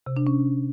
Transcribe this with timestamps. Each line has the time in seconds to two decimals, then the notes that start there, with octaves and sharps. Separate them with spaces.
0.06 C3
0.17 D4
0.27 C#4